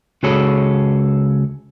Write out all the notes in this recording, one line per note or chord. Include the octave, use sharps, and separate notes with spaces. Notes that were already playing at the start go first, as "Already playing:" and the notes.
C#2 F#4 G#4 A4 C#5 B5